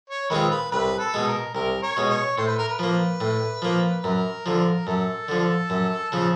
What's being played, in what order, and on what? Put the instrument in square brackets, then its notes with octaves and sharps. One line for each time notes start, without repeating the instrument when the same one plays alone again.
[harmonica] C#5
[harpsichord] D#3 G#3 C4 F4 [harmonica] B4
[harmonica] B4
[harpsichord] C2 [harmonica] B4
[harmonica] A4
[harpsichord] B2 G#3
[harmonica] A#4
[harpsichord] C2 [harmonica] A#4
[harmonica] C#5
[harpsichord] B2 G#3
[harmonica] C#5
[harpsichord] A2 [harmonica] C5
[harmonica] B4
A#4
B4
[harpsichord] F3 A#3
A2
F3 A#3
[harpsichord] F#2 [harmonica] A#4
[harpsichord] D3 F3
[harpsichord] F#2 [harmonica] A4
[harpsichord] D3 F3
F#2
C#3 F3